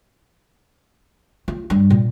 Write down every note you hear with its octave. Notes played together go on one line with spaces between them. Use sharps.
F4
G2
A#2